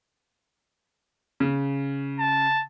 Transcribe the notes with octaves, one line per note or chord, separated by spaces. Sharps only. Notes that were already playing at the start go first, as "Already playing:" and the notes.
C#3
A5